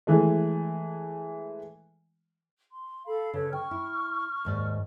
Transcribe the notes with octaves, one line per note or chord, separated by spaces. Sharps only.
E3 G#3 A3
C6
A4 F5 B5
C#3 A4 B4 C#5
G5 C#6 F6
E4
D#2 G#2 D5